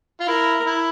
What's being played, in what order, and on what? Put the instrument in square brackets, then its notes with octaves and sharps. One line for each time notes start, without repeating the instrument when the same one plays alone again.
[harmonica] F4
[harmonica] E4 [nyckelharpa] A#4
[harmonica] E4